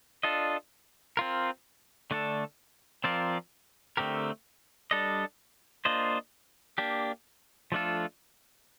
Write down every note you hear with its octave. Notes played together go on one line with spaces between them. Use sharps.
D4 F4 A4 D#5
C4 F4 A#4
D3 A3 D4 A4
F3 C4 F4 A#4 D5
D3 A3 C4 G4 A#4
G3 D4 A4 D#5
A#3 D4 F4 C5 D#5
A#3 D4 G4
F3 A3 D4 F4 A4